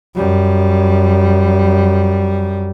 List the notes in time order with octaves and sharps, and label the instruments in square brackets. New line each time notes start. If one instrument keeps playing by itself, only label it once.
[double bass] F#2 G3